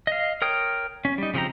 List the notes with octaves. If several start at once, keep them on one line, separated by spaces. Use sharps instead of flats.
D#5 F5
A#4 C#5 G5 D#6
C#4
G3 D#4
C#3 F3 C4 G4 A#5